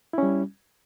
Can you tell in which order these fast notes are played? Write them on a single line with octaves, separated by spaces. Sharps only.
E4 C#4 G3